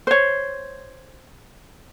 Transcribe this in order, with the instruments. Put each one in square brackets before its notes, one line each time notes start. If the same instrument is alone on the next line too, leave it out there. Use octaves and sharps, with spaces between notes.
[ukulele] C5 C#5